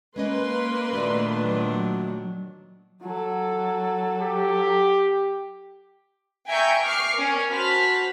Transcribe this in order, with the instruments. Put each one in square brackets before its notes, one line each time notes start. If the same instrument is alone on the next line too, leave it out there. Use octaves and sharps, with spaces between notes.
[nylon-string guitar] G#3 C#4 D#5 [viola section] A#3 B4 C6
[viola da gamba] A#2 D#3 D4 [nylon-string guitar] A3 F#4 D5
[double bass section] F#3
[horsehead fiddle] F#3 A4
[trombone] G4
[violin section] E5 G5 G#5 A#5 C#6 G6
C#6 D6 F6 C7
C#4 A#4
F#4 C5 A5 B5 F6 B6